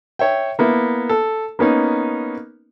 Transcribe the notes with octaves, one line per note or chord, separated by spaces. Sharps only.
C#5 E5 G5
A#3 B3 E4
A4
A#3 B3 C#4 D#4